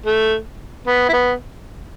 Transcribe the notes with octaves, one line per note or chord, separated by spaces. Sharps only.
A3
B3
E4
B3